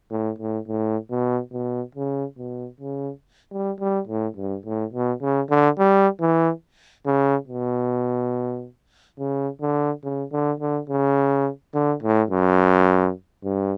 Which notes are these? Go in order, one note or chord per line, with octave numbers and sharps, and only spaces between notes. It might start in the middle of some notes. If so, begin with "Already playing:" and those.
A2
A2
A2
B2
B2
C#3
B2
C#3
G3
G3
A2
G2
A2
B2
C#3
D3
G3
E3
C#3
B2
C#3
D3
C#3
D3
D3
C#3
D3
A2
F#2
G2